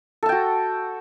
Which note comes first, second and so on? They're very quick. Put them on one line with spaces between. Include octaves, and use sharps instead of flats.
A4 A5 G5 F#4